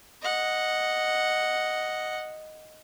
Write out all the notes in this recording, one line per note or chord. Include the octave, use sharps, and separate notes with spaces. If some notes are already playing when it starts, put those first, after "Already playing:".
D#5 F#5